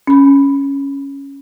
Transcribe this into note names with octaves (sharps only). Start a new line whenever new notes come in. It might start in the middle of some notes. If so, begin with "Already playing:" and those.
C#4 B5